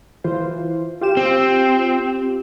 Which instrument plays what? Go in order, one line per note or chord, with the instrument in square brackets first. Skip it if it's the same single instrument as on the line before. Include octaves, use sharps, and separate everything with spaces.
[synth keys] E3 F4 C5
F4 G4 E7
[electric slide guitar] C4